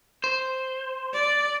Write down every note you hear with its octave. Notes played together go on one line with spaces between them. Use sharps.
C5
D5